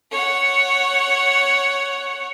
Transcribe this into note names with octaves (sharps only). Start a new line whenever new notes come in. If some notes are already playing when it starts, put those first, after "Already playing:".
C#5 F#5